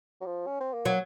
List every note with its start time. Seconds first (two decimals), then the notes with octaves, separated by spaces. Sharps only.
0.21 F#3
0.26 F3
0.47 C#4
0.61 C4
0.73 A#3
0.85 F#3